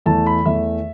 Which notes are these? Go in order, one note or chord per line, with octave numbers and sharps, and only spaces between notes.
E2 E3 A3 A5
B5
E2 E3 A3 E5